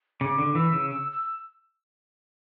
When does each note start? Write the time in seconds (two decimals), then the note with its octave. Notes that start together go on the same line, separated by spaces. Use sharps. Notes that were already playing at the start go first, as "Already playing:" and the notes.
0.20 C#3 D6
0.38 D3
0.55 E3 E6
0.72 C#3
0.90 E6
1.12 E6